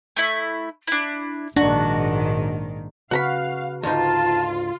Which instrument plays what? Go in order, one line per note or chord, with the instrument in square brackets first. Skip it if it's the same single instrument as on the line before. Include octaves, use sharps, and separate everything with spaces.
[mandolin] A3 E4
D4 E4
[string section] A#1 G#2 D#3 [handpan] D4 [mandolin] F#4
[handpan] C#3 F#4 B4 [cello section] F5 [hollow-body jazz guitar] F#5 A#5 B5
[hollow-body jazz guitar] D2 G#2 D#4 [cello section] F4 [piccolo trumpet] A5